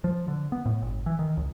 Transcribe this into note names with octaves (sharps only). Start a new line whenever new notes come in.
F3
D3
B3
A2
G1
E3
D#3
C#2